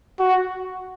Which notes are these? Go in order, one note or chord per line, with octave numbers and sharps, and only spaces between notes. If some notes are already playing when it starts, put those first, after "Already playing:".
F#4